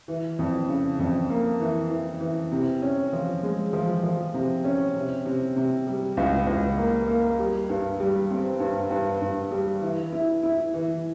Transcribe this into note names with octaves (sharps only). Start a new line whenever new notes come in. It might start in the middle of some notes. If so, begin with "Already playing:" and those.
E3
F2
C#3
F2
A#3
E3
E3
E3
C3
C#4
F3
G#3
F3
F3
C3
C#4
C3
C3
C3
G3
C#2
C#2
A#3
A#3
G3
G2
G3
C4
G2
G2
G2
G3
E3
E4
E4
E3